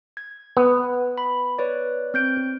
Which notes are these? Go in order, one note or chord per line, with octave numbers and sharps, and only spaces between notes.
G#6
B3 B4
B5
B4 C#5 D5
C4 G6 D7